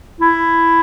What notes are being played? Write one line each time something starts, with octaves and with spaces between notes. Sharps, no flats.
E4